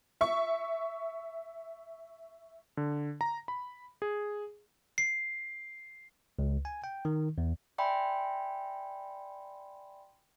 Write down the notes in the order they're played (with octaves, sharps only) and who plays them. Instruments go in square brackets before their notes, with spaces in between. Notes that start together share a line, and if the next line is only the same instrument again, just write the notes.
[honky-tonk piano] E5 C#6
[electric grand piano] D3
A#5
B5
G#4
[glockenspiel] C7
[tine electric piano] C#2
G#5
G5
D#3
E2
[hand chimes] D5 E5 G5 G#5 B5 C6